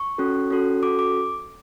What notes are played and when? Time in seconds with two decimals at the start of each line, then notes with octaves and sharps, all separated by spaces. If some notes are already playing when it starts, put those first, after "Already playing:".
Already playing: C#6
0.18 C#4 F#4 A4
0.50 C#4 F#4 A4
0.82 C#4 F#4 A4 D6
0.99 D6